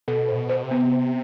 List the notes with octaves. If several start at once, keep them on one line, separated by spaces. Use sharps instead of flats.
B2 A4
A2 C5
B2
C5
C3
B3
C5